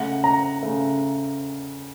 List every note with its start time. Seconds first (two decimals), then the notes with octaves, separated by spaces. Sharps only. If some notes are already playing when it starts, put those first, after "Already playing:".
Already playing: C#3 A3 F#5
0.24 A#5
0.63 C#3 A3